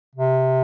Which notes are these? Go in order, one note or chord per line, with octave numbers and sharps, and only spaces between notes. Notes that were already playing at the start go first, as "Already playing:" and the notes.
C3